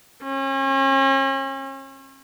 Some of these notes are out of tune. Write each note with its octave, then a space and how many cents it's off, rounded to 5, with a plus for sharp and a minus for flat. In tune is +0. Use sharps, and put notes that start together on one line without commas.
C#4 -40